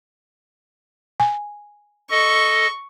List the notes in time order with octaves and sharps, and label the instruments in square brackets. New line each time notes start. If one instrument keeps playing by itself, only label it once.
[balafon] G#5
[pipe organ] A4 D#5 [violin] C#6